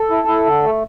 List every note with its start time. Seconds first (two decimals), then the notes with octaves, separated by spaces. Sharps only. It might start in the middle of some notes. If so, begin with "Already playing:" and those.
Already playing: A4
0.10 E4
0.28 E4
0.46 D3
0.63 A3